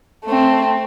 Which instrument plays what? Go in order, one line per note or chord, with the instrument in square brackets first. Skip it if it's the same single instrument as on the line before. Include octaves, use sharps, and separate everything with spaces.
[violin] A3 C4